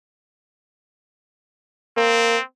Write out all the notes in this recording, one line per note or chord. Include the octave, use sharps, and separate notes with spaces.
A#3 C4